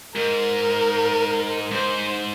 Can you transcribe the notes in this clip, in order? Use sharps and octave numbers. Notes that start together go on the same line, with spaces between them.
G#2 A#4
G#2 C5